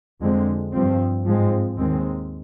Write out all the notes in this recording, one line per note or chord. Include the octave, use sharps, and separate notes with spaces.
F2 D3 G#3 C4
G2 F3 C4
G#2 F3 G#3 C4
D#2 D#3 G#3 C4